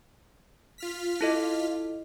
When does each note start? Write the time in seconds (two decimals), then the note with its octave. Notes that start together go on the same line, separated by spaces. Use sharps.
0.78 F4 F6 B6
1.21 E4 A4 D#5